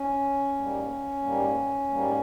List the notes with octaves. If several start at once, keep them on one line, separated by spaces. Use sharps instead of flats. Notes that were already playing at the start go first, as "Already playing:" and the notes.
Already playing: C#4
G#2 G3 A#3
G#2 G3 A#3
G#2 G3 A#3